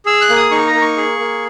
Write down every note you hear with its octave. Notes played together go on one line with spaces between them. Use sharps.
G#4 E6
F#6
A#3
D#6
D#4 C#6
A#5
A#3
C#6
G#4
A#3